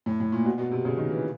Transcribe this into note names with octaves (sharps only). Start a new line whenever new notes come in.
A2
A2
A#2
B2
B2
C3
C#3
D#3
E3